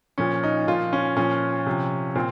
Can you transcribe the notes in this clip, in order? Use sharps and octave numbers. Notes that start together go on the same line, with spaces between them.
A#2 F3 C#4
D#4
A#2 F3 F4
C#4
A#2 F3 C#4
C3 F3
A#2 C4